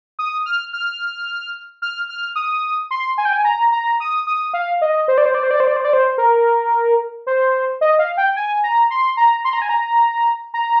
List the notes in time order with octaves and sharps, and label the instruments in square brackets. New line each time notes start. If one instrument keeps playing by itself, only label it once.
[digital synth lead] D#6
F6
F6
F6
F6
D#6
C6
G#5
G5
G#5
A#5
A#5
D#6
D#6
F5
D#5
C5
D5
C5
D5
C5
D5
C5
D5
C5
D5
C5
A#4
C5
D#5
F5
G5
G#5
A#5
C6
A#5
C6
A#5
G#5
A#5
A#5